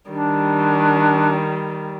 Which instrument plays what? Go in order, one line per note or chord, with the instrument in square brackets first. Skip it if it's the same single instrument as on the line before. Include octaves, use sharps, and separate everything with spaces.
[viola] D#3 G3 [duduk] D4